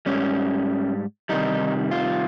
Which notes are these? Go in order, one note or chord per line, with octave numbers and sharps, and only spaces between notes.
G#2 G3 C#4
C3 D#3 G3 D#4
F4